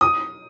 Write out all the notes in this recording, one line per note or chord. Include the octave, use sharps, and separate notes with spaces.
D#6